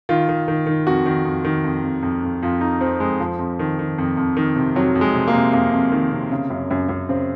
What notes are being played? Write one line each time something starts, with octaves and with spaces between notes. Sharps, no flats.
D#3 F4
D#3
D#3
D#3
F2 F#4
D#3
F2
D#3
F2
F2
F2
F2
F2 F4
F2 D#4
F2 C4
F2 G#3
F2 F3
F2
D#3
D#3
F2
F2
D#3
C3
F2 F#3
F2
G#3
C3
A#3
C3
F2 A#3
F2
D#3
C3
C#3
F#2
F#2
F#2
C#3 C4